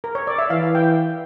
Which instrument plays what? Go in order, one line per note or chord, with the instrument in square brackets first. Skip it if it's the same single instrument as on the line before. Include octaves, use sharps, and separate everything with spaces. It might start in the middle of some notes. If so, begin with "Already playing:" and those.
[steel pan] A#4
C#5
D5
E5
[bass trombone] E3 [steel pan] F5
[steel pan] G5